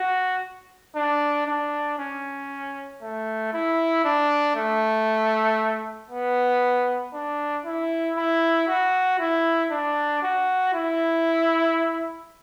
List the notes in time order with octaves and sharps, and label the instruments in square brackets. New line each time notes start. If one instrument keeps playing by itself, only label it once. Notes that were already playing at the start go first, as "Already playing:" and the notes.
Already playing: [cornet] F#4
D4
D4
C#4
A3
E4
D4
A3
B3
D4
E4
E4
F#4
E4
D4
F#4
E4